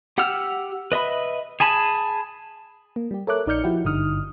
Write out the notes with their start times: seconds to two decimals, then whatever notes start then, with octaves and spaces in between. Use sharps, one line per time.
0.18 G4 F#5 G5 E6 F6
0.92 B4 D#5 E5 B5
1.60 G#4 G#5 A5 B5
2.96 A#3
3.11 G3 G4
3.27 A4 A#4 C#5 E5 D6 F#6
3.46 A#1 D#4 D5 F6 G6 C#7
3.64 F3 E4 F#4 G4
3.85 G#1 G2 D3 D#4 D#6 F6